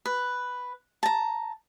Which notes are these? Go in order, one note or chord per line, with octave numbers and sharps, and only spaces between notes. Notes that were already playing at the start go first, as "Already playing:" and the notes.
B4
A5 A#5